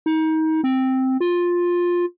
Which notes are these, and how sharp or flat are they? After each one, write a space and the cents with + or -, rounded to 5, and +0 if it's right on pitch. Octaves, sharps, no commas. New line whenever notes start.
D#4 +30
C4 +0
F4 +10